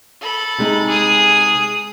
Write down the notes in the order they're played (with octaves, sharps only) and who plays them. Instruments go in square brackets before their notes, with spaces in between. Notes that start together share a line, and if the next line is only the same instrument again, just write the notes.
[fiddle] A4 B5
[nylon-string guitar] C3 G#3 D#4
[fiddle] G#4 D#6